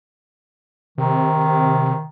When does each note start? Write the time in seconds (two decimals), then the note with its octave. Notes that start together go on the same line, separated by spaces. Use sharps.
0.98 C3 D#3